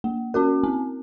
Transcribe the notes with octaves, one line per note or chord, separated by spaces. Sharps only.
A#3
C#4 F#4 A#4
C4